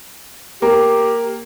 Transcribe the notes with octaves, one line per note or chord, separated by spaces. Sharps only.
A#3 G4 A#4